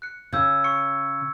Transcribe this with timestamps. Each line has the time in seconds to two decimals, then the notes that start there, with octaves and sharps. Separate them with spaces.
0.02 F#6 C#7
0.33 C#3 E6 G6 G#6
0.64 C#6 C#7